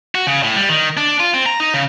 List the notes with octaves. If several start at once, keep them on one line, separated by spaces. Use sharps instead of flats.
F#4
C#3
A2
G3
D#3
D4
F4
C4
A#5
D#4
C#3